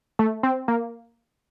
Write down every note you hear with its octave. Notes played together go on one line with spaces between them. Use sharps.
A3
C4
A#3